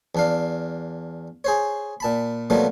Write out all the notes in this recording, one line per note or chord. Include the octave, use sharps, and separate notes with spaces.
E2 D4 F5
G#4 C5 C#5
A#2 A5 B5
B2 F#3 G3 A3 A#3 F4